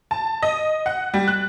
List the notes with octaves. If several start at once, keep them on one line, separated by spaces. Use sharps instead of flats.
A5
D#5
F#5
G3
F#6